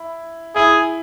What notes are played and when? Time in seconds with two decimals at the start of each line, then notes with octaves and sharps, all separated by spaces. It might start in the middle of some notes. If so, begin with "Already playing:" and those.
Already playing: E4
0.55 E4 G#4